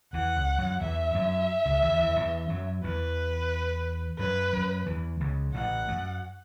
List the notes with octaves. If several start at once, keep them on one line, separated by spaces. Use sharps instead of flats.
E2 E3 F#5
C#2 C#3
F#2 F#3
E2 E3 E5
F#2 F#3
C#2 C#3
E2 E3
E2 E3
E2 E3
F#2 F#3
E2 E3 B4
F#2 F#3 B4
F#2 F#3
E2 E3
C#2 C#3
A1 A2 F#5
F#2